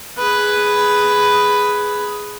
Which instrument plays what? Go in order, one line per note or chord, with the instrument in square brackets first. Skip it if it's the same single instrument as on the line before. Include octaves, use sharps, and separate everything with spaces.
[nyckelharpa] G#4 B4